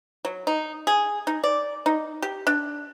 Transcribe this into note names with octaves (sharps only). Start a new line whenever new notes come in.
F#3
D#4
G#4
D#4
D5
D#4
G4
D4